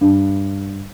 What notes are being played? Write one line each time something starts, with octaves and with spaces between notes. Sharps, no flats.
G2